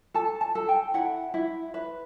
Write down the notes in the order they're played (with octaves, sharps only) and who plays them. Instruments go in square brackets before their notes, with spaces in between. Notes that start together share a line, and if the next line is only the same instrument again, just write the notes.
[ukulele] A4 A5
A5
A4
G5
E4 F#5
E4
B4